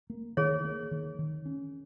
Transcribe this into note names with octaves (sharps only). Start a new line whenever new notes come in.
A#3
D#3 G#4 C#5
A#3
D#3
D#3
C#4